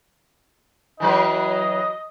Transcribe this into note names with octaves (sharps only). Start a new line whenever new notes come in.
E3 F#3 B4 D#5